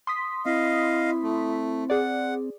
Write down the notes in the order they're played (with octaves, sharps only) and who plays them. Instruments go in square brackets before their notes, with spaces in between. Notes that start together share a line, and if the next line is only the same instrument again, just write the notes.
[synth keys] C6 D#6 B6
[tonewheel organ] C4 [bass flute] E4 [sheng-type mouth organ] D#5 F5
[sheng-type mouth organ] A3
[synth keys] G#4 D5 [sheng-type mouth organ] F#5